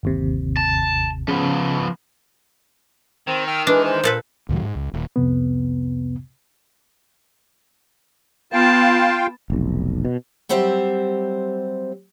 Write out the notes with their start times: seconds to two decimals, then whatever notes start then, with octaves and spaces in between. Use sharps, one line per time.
0.03 G1 D#2 C3
0.57 A5
1.28 C#3 F3 B3
3.27 D#3 C4
3.47 G5 E6 F6
3.67 E3 G#3 D4 B4
3.84 C5
4.04 A#2 A4 B4
4.49 C#2 A2 D#3 F#3
4.62 G#2
4.76 C#2
4.94 D#1
5.16 C2 F2 C3 B3
8.53 B3 F4 F5 G5 A5
9.50 F1 B1
10.05 B2
10.49 F#3 G3 C4 G4 C5 E5